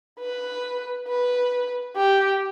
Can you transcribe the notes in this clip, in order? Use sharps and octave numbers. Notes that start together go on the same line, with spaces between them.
B4
B4
G4